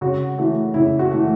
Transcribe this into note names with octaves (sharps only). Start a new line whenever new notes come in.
C#3 F#4
E3 A3 F#4
C#3 E4
F#4
E3 A3